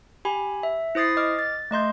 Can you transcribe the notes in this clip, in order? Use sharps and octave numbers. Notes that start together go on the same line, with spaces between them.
G4 G#5 B5
E5
E4 C5 D#6 A6 C7
D#5 D6 F6
A6
A3 D#5 C6 G6